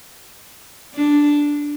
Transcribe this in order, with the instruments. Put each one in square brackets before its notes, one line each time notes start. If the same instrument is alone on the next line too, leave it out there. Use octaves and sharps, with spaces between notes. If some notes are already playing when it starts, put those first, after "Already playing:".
[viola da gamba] D4